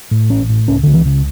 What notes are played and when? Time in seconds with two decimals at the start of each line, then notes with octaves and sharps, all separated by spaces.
0.11 A2
0.30 A1 C#4
0.49 A2
0.67 C#2 C#4
0.83 C#2 D3
0.93 E3
1.05 C#3